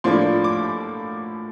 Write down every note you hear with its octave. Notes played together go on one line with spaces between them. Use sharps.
A2 F3 A#3 D4 C6
D6